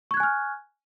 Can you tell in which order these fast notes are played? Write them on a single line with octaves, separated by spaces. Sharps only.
C#6 G#6 F#6 G#5 F6